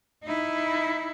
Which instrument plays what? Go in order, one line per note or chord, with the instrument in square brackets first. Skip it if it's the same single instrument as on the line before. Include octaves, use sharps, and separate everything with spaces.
[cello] D#4 E4